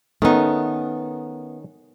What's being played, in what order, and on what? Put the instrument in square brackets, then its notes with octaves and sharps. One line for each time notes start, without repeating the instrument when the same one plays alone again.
[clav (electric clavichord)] D#3 C#4 D#4 [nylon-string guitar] A3 B3